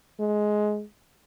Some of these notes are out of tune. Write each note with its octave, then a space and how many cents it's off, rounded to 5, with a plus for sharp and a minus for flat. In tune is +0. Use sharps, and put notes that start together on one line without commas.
G#3 +15